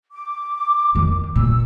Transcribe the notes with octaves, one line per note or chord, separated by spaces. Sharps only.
D6
F2 D#3
A#2 A#3 E6